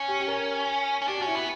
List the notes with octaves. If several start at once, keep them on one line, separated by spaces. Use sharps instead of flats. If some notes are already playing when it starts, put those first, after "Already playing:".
Already playing: C#4
G4
G4
A#4
C#4
D4 G4
F#4
C#4 E4
B3 F#4